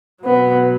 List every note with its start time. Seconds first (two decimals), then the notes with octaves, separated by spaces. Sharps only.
0.24 B2 F#3 B3